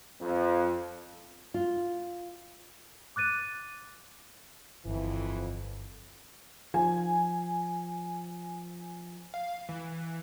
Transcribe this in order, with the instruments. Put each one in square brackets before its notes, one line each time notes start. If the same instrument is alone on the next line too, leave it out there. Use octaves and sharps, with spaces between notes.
[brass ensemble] F2
[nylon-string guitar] F4
[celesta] D6 F#6 A6 D#7
[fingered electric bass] G1 [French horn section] F2 E3
[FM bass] F3 [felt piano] G#5
[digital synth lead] F5
E3